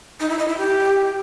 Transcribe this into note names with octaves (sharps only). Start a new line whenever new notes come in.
D#4
E4
D#5
E4
G4